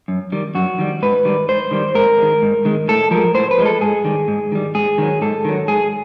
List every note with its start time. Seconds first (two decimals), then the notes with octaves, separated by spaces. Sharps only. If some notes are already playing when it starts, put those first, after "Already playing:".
0.08 F#2
0.32 D#3 G3
0.55 F#2 F#4
0.79 D#3 G3
1.02 G#2 B4
1.25 D#3 G3
1.49 G#2 C5
1.71 D#3 G3
1.95 G#2 A#4
2.18 D#3 G#3
2.42 G#2
2.65 D#3 G#3
2.88 A2 A4
3.11 F3 G#3 A#4
3.35 A2 C5
3.51 B4
3.58 F3 G#3
3.66 A4
3.81 G#2 G#4
4.04 D#3 G3
4.28 G#2
4.52 D#3 G3
4.75 G#2 G#4
4.98 D#3 F#3
5.22 G#2 A4
5.45 D#3 F#3
5.68 G#2 G#4